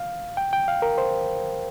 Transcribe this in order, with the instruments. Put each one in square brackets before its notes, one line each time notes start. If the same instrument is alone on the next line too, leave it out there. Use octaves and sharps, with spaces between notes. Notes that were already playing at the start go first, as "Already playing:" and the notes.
Already playing: [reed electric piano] F5
G5
G5
F5
A#4
C5